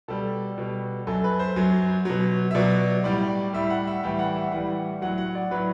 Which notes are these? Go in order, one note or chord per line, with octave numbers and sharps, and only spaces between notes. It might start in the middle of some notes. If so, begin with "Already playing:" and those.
B2 G3 A4
B2 G3
F#2 F#3 A4
B4
C5
F#2 F#3
B2 F#3
E5
B2 F#3 D5
A2 G3 D5
A2 G3 E5
F#5
E5
A2 E3 G3 G5
F#5
E5
A2 E3 G3 F#5
A2 F#3 F#5
F#5
D5
A2 F#3 B4